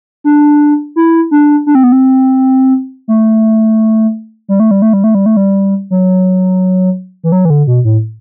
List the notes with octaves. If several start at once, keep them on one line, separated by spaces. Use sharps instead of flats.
D4
E4
D4
D4
C4
B3
C4
A3
G3
A3
G3
A3
G3
A3
G3
A3
G3
F#3
E3
F#3
E3
D3
B2
A2